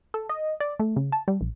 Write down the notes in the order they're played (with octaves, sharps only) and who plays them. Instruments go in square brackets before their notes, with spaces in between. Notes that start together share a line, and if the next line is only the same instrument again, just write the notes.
[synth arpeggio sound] A4
D#5
D5
A3
C#3
A5
G3
A#1